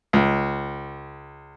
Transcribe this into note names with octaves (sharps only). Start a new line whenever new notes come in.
C#2